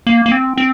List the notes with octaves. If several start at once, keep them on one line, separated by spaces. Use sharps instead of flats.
A#3
A#3
C4
C4